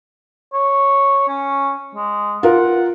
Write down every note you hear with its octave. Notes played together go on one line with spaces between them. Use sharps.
C#5
C#4
G#3
F4 A#4 F#5